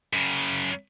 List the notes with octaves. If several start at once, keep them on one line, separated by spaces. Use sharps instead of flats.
F#2 C#3